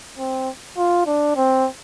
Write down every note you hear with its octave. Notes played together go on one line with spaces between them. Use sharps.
C4
F4
D4
C4